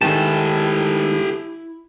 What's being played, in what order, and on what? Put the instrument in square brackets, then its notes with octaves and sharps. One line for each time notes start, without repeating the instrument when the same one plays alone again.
[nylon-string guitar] D2 D#3 G#5 [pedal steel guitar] G#3 A5 [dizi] E4 [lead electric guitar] G4 A4